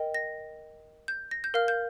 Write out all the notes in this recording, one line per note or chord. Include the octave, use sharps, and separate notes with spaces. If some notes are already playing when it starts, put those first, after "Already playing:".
Already playing: A#4 D#5 G5
A#6
G6
A#6
G6
A#4 F5 F6
G6